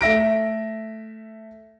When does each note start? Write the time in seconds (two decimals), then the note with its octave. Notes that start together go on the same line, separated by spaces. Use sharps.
0.01 A3 E5 A#6 D7